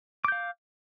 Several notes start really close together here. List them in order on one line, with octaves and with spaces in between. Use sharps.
D6 G6 F5